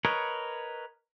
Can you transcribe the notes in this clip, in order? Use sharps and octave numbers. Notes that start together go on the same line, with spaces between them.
A#4 B4 C#5 D#5